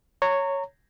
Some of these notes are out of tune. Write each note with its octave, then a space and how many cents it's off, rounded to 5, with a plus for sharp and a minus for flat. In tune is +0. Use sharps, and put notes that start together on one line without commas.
C#5 +0 A#5 -25